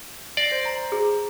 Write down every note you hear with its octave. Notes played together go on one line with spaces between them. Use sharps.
D5 A#6 C7
C5
A#5
G#4